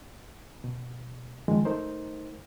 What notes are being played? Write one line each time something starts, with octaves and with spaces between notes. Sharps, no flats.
B2
F#2 D#3 F3 G#3
A3 D#4 A#4 C5